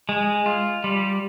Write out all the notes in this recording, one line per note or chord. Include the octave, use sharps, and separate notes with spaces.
G#3
F4
G3